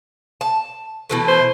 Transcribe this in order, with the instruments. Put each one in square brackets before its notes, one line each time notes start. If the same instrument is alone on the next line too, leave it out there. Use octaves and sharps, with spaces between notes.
[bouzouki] A5
B2 E3 A3
[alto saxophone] C5